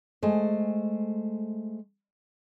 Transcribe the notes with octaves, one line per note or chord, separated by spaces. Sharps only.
G#3 A3 C5